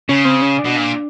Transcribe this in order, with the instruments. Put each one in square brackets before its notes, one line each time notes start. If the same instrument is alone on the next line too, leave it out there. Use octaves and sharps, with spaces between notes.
[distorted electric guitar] C#3 [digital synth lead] C#4
[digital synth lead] C4
C#4
D4
[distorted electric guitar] B2
A#2